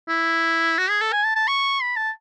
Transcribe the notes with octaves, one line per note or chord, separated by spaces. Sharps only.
E4
F#4
G#4
A4
G#5
A5
A5
C#6
B5
A5